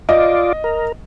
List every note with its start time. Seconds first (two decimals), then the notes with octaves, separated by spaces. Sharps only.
0.09 F4 D5 D#5
0.64 A#4